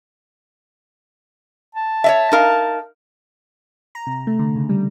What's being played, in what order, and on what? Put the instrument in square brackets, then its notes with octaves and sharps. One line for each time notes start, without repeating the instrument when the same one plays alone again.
[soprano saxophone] A5
[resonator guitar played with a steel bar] C#5 D#5 E5
D#4 A#4 F5
[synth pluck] A#5
C3
A3
D3
C#3
G3